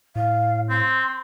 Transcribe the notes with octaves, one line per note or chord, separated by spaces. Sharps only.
A2 F5
C4 C6